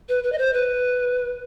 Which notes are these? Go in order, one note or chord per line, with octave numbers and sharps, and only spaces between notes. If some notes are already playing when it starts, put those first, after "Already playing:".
B4
B4
D#5
C5
B4